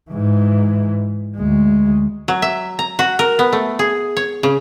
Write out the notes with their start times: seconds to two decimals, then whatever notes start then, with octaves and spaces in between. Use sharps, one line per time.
0.11 G#2 E3
1.36 D2 G#3
2.28 F#3
2.42 E5
2.79 A#5
2.99 F#4
3.19 A#4
3.39 B3
3.53 A3
3.79 G#4
4.17 C#5
4.43 C#3